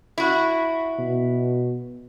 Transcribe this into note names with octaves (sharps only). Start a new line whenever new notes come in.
E4 F#4
B2